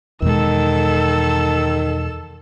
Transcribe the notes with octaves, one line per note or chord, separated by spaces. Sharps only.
E2 B2 D#3 G#3 A4 E6